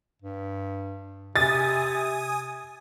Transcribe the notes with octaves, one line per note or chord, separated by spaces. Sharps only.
G2
C3 G#5 D#6 A6